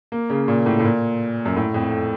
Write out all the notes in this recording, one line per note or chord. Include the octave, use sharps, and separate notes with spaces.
A#3
C#3
A#2
A2
A2
A#2
F#2
A2
F2